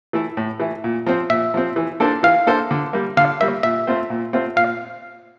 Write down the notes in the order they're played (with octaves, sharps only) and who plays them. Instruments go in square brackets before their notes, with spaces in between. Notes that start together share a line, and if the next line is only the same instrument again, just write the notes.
[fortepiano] E3 A3 E4
A2
E3 A3 E4
A#2
F3 C4
[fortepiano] A#2 [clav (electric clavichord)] E5
[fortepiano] F3 C4
E3
A#3 D4 A4 C5
[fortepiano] E3 [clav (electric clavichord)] F5
[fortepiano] A#3 D4 A4 C5
D3
G3 A#3
[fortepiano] D3 [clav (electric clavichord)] F5
[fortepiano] G3 A#3 [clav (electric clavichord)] E5
[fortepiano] A#2 [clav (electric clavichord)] E5
[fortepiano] A3 C4 F4 C5
A#2
A3 C4 F4 C5
[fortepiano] A#2 [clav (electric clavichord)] F5